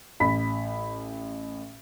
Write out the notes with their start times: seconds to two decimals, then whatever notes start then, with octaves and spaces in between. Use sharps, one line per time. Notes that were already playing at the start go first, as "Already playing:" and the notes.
0.20 A1 B5 B6